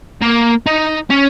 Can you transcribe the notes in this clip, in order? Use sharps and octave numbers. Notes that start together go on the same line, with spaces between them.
A#3
D#4
C#4